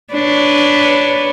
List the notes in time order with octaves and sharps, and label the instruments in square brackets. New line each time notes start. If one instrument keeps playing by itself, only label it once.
[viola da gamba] D4 B4 C#5